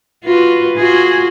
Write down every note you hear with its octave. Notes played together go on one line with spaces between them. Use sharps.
F4 F#4 B4
F4 F#4 G#4